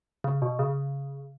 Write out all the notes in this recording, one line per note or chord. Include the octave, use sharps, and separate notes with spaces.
C#3
B2
C#3